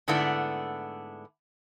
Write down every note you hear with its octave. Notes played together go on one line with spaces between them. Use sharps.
G#2 D3 A3 B3 D4 E4